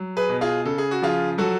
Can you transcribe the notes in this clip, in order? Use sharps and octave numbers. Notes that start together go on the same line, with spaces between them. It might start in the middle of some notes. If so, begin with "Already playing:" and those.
Already playing: F#3
G#4 B4
B2
F4 G#4
C#3 A4
G#4
F#4
F3 F4 G#4
F#3 F#4 A4